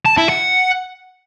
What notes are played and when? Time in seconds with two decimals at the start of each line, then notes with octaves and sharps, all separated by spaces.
0.06 A5
0.18 E4
0.29 F#5